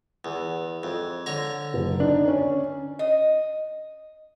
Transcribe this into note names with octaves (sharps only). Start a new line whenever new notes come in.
E2
F2
D3 C#5 A#5
F#1
D4 D#4
C#4
D#5